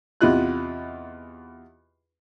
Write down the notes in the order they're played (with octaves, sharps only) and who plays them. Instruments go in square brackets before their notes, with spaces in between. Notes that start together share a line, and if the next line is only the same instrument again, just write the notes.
[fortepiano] E2 C3 E4 F4 D#5 F#6